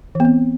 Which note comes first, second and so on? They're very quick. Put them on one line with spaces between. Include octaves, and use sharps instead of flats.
E3 B3 C4